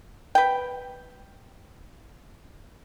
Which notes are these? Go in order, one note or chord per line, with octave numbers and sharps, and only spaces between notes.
B4 G5